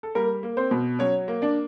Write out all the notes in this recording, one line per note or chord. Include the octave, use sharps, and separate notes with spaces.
A4
G3 A#3 A#4
A#3
C4 C5
B2
F#3 C#4 C#5
A#3
D4 D5